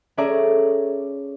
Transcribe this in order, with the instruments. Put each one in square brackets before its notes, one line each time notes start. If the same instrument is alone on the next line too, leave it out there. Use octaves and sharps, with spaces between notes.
[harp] C#4 G#4 A4 D5 E5 A#5